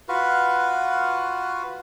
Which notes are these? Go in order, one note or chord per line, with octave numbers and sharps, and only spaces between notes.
F4 F#4 B4